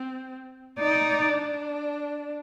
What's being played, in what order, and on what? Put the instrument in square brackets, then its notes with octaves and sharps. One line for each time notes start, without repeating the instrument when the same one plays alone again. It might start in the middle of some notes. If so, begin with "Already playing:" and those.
Already playing: [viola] C4
[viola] D#4 [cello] D5
[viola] D4